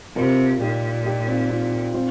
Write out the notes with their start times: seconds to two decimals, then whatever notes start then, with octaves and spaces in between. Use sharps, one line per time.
0.16 C3 F4 A#4
0.60 A#2 D#4 G4
1.05 D#4 G4
1.28 C4 F4
1.50 C4 F4
1.94 C4 F4